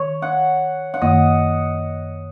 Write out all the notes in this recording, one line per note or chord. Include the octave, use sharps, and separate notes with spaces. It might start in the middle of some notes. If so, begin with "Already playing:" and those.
Already playing: D#3 C#5
F#5
F#5
F#2 D#3 A#3 D#5